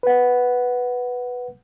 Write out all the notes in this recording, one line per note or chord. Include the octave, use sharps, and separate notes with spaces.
B4 F#5